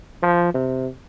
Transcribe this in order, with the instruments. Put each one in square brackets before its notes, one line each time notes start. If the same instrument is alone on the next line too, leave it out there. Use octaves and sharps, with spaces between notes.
[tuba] F3
C3